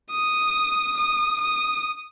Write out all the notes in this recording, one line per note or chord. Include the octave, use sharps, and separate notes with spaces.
D#6
D#6
D#6